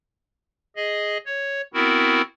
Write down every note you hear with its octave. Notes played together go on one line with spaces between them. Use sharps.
G#4 D#5
C#5
B3 C4 E4 F#4 A#4